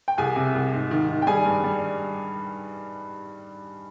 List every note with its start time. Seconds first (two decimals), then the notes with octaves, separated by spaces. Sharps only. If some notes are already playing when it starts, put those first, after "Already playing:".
0.08 G5
0.18 C2 G#4 G#5
0.36 C3
0.55 C2
0.73 G#2
0.91 D#3
1.09 D#3
1.22 G5
1.27 G3 G#4 G#5
1.45 G2
1.64 G3